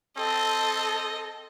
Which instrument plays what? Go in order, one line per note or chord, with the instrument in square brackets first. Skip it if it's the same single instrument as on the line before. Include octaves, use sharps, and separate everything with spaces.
[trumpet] C4 [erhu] A4 [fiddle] D#5